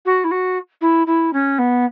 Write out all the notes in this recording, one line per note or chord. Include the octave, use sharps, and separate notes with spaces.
F#4
E4
F#4
E4
E4
C#4
B3